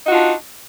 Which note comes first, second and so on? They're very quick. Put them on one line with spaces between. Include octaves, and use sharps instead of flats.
D#4 F#4 F4 D4